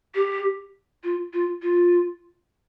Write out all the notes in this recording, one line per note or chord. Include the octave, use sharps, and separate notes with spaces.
G4
F4
F4
F4